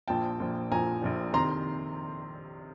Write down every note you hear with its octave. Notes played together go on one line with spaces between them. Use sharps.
A#1 A#2 F3 G5 A5
A#1 A#2 F3
A#1 A#2 F3 G#5 A#5
A#1 A#2 F3
C3 D#3 A#5 C6